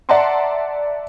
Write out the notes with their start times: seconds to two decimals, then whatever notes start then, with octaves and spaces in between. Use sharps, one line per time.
0.09 D5 E5 F#5 A5 A#5 C6